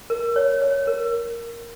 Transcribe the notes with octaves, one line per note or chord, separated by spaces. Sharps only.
A#4
C#5
C#5
A#4